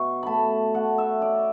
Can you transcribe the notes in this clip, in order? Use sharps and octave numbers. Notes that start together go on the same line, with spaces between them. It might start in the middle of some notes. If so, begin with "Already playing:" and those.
Already playing: B2 E4 C#6
A3 A5 B5
A3 F#5
E5
C#4 D5